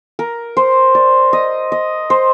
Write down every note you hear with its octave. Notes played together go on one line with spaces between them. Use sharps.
A#4
C5
D5
D#5
D#5
C5